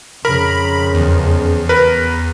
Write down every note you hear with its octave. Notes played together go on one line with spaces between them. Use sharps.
F2 C#3 A#4 B5
E2
A#4 B4